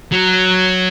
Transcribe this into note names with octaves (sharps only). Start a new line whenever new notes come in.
F#3